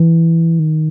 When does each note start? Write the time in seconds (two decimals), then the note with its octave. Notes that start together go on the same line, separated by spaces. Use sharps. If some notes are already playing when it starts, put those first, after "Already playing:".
Already playing: E3
0.59 D#3